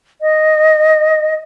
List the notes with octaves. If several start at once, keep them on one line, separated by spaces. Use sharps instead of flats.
D#5